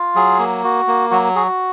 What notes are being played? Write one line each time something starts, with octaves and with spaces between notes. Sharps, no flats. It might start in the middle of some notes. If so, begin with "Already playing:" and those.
Already playing: F4
F#3 G#4
A#3
F#4
A#3
F#3 F#4
F#4 G#4